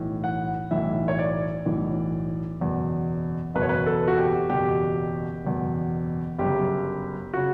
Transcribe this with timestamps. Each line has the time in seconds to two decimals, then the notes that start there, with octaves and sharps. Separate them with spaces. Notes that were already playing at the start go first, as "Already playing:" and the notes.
Already playing: B1 A2 E3
0.24 F#5
0.71 B1 A2 E3 E5
1.08 C#5
1.19 D5
1.65 B1 A2 E3
2.60 F#1 E2 B2
3.54 F#1 E2 B2 B4
3.62 C#5
3.69 B4
3.86 A4
4.08 F#4
4.18 G4
4.50 F#1 E2 B2 G4
5.45 F#1 E2 B2
6.38 G1 F#2 C#3 G4
7.34 C#3 F#4